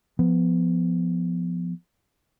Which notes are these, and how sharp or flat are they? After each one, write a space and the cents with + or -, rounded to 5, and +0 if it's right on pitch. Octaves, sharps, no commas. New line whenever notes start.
F3 +0 B3 +5